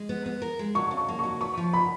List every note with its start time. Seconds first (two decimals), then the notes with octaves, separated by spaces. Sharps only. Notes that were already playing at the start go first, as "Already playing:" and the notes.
Already playing: G#3
0.09 B3
0.26 B3
0.42 A#4
0.59 G#3
0.75 F#3 C#6
0.91 C#3
0.97 C#6
1.08 A#3
1.19 F#3 C#6
1.41 B4 C#6
1.57 F3
1.73 B4 B5